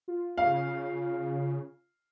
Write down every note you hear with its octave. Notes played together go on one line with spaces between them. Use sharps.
F4
C#3 F5